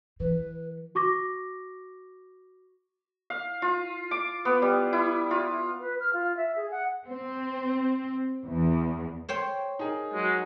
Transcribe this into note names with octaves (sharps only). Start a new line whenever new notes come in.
E3 B4
F#4 C#6 D6 A#6
F5
F4
D6
B3
G3
E4
F4
B4
F6
F4
E5
G#4
F#5
C4
E2
C5 C#5 G5
D#4 G#4 A#4
F#3 G#3